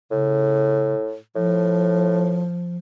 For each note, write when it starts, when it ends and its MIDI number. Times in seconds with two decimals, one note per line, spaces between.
0.11 1.15 45
0.11 0.93 49
1.36 2.47 45
1.36 2.77 53